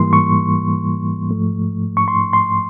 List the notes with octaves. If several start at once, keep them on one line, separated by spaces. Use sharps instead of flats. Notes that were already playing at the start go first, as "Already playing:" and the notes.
Already playing: G#2 E3 G3 A#3 C6
C#6
G#2 F3 A3
C#6
C6
C6